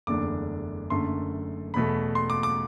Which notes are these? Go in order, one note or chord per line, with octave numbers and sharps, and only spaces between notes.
F#1 E2 D3 A3 D4 D6
F#1 F#2 D3 A3 C6
E2 B2 A3 B5
C6
D6
D6